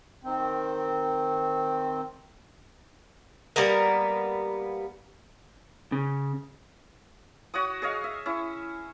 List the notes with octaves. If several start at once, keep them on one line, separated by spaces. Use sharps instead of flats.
D#3 C4
G3 A#3 B3 A#4
C#3
F#4 C#5 F#5 D#6
G#4 C#5 D#5 F5
E5
C#4 E4